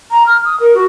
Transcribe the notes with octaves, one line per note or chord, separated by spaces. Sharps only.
A#5
F6
D#6
A#4
F#4